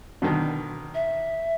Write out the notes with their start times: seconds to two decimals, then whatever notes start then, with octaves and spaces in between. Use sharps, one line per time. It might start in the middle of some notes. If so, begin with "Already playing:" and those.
0.22 B2 D3 D#3
0.94 E5